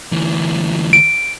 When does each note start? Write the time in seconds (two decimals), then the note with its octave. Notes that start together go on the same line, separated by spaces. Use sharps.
0.12 D2 E3
0.93 D7